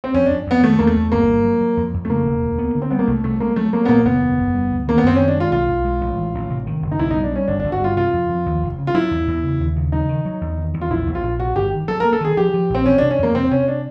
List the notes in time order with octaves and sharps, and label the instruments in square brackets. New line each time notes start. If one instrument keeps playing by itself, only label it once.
[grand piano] C4
[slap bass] F2 [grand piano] C#4
[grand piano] D4
[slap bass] F2
[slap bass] F2 [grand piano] B3
[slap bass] D#3 [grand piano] A3
[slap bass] E2 [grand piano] A#3
[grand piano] A3
[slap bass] E2
[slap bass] G1 [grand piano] A#3
[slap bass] G2
F#3
F#3
F2
F2
[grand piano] A3
[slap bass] C#3 [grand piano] A#3
[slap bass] E1
D2
B3
D3
[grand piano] C4
[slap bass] G3 [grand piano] B3
[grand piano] A#3
[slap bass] C2 [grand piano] A3
[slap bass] C2 [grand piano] A3
[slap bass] G#3 [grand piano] A#3
[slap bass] F#3 [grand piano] A3
[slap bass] F#3 [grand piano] A#3
[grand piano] B3
[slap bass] A#2 [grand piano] A#3
[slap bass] F#1 [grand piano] B3
[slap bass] E2
F#1
G3
D2
[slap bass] D#3 [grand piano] A#3
[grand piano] B3
[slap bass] F#2 [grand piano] C4
[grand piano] C#4
[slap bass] D#3
[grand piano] D4
[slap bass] G#3 [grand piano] F4
[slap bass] B1 [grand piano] F4
[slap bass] B1
G#3
A1
E3
A1
C3
D#3
F#1
[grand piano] D#4
[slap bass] B1 [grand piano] E4
[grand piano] D#4
[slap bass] G3
[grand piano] D4
[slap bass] G3 [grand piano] C#4
[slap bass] G1 [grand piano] D4
[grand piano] D4
[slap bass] G1
[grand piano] F#4
[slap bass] G2 [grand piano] F4
[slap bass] C3 [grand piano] F4
[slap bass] F2
F3
D#2
F1
C#3
[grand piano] F4
[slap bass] F#3 [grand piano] E4
[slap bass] E2
E2
C#3
D#2
C#3
[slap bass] F#3 [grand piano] D#4
[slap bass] D#3
F#3
E2
D#3
E2
[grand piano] F4
[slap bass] A#1 [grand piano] E4
[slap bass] A#1
[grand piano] F4
[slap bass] A#1
[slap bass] C3 [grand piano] F#4
[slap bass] G1 [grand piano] G4
[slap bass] D#3
[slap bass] F#3 [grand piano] A4
[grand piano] A#4
[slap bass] A#3
[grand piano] A4
[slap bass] D#3 [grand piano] G#4
[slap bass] F3 [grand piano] G4
[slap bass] F3
[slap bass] A#1 [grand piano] C4
[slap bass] E3 [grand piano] C#4
[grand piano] D4
[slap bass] C3
[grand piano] C#4
[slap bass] F2 [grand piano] A#3
[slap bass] C3 [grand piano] C4
[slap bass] C3 [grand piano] C#4
[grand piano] D4